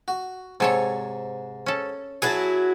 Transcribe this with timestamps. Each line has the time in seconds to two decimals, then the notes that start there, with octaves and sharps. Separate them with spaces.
0.08 F#4
0.60 G#2 C3 A4 C#5 G#5
1.66 C#4 A4
2.22 F#3 E4 F#4 G#4 A5